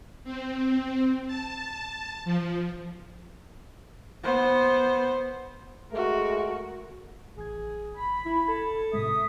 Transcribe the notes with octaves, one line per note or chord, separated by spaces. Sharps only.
C4
A5
F3
B3 C5
G#3 A3 F#4 A#4
A1 G#4 G#6
B5
E4
A4 G#6
A2 C3 G#3 E5 D#6